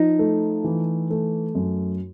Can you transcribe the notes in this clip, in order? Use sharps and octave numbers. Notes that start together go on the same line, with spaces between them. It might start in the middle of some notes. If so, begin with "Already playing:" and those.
Already playing: F3 D#4
A3
E3
A3
F#2